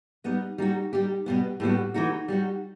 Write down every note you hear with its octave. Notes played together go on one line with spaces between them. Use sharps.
G3 B3 D#4
G3 D#4 F#4
G3 D#4 G4
B2 G3 B3
A2 G3 B3 F#4
E3 A3 D#4 F#4
G3 D#4 F#4